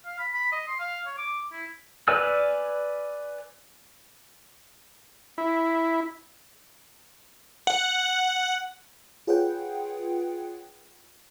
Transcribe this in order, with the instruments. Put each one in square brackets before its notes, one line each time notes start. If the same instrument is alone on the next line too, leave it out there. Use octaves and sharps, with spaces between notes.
[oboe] F5
B5
B5
D#5
C6
F5
C#5
D6
E4
[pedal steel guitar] B4 D5 G#5 E6 F6
[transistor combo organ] E4
[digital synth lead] F#5
[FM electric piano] F4 G#4 B4 C#5 F#5 G5